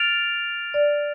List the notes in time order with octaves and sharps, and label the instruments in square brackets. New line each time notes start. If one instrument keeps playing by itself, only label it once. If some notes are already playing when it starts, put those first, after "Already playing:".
Already playing: [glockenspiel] F6 A6 D7 F7
[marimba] D5